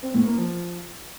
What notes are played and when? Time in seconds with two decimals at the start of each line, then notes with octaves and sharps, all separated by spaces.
0.03 C4
0.14 A2
0.26 A#3
0.38 F3